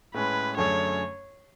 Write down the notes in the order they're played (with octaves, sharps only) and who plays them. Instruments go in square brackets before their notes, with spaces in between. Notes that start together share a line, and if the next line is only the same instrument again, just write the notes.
[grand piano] A2 G#3 C#4 [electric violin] B4
[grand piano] F#2 D3 A3 C#4 G#4 [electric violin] C#5